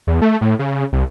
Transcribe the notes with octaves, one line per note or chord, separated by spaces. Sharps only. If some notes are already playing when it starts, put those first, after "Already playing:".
E2
A3
A2
C#3
C2